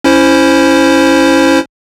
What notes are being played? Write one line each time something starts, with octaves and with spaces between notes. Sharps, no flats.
C#4 E4 C5